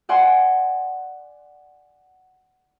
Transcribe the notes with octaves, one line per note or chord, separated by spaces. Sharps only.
D5 F#5 G#5 C6